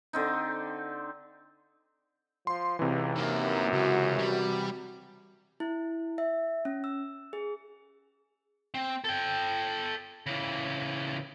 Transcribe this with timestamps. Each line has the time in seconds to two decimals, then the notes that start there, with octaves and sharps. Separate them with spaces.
0.13 D3 C4 D#4
2.47 F3 C6
2.79 C#2 C3 E3
3.16 F#2 D#3 A#3
3.73 C#2 F#4
4.18 G3
5.60 E4
6.18 E5
6.65 C#4
6.84 E6
7.33 G#4
8.74 C4
9.04 A4 G5
10.26 C#3 E3